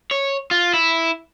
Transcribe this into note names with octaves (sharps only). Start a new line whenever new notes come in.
C#5
F4
E4